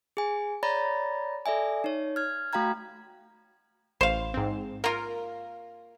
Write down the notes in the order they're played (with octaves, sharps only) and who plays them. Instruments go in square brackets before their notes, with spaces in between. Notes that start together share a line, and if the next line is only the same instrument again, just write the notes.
[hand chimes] G#4 G#5
C#5 D5 A#5 B5 A6 A#6
A4 D5 E5 G#5
D#4 C#5
F6 G#6
A3 F#4 F5 G5 A#5 G#6
[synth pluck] A1 [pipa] C5 F5
[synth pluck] G#2 C4
[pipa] A#3 F4 [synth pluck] A#4